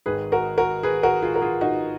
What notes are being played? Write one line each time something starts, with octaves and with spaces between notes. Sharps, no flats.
G#1 G#2 D#3 G#4 B4
F#4 A#4
F#4 A#4
G#4 B4
F#4 A#4
F4 G#4
A#4
F4 G#4
D#4 F#4